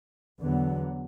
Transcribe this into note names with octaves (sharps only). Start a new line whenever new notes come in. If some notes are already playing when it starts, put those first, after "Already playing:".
E2 D3 F#3 B3